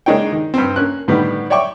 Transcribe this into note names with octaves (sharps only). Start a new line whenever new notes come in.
G#3 A#3 D4 D#4 C#5 G5
D#3
G2 C4
A#3 C#4 F#6
A2 D3 D#3 G3 B3
C#5 D5 E5 G5 C#6 D6